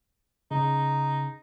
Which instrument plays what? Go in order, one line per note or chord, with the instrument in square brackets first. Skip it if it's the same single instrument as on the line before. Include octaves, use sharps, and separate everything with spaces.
[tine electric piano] C#3 [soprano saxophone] D#4